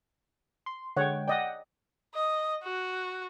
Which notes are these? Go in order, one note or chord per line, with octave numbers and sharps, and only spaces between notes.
C6
D3 G#3 C#5 F#5 G5
D5 D#5 F#5 G5
D#5
F#4